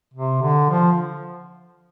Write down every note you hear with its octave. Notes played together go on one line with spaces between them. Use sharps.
C3
D3
F3